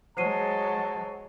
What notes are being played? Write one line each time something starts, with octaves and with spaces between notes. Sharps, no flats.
F#3 G#3 C5 A5 C7 D#7